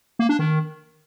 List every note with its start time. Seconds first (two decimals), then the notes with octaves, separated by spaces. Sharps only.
0.19 A#3
0.29 D4
0.39 D#3